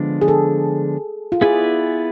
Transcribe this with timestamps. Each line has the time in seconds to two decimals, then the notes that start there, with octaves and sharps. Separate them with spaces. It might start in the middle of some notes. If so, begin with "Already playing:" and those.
Already playing: D3 F3 G#3 B3 D4
0.21 G#4
0.28 A4
1.32 F4
1.41 B3 E4 G#4 B4 D5